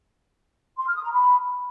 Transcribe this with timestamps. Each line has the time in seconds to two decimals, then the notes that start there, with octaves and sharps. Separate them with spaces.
0.78 C6
0.86 F6
0.95 D#6
1.04 A#5
1.12 B5